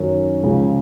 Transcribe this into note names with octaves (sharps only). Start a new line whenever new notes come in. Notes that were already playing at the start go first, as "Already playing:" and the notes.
Already playing: F#2 D#3 F#3 C#4
C#2 C#3 F3 G#3